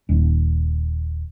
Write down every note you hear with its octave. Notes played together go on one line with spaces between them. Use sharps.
D#1